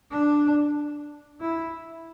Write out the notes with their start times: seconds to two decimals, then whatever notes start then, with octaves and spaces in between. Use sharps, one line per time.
0.12 D4
1.41 E4